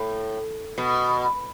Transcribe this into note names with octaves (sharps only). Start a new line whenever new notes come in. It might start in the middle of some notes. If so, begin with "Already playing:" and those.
Already playing: A2
B2